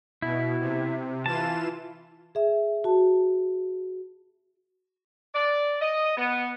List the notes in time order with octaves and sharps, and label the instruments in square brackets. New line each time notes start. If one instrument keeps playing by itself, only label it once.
[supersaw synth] B2 [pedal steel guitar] E4
[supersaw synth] C3
[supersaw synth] E3 F4 E7 [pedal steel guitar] A5
[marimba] G#4 E5
F#4 A5
[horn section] D5
D#5
B3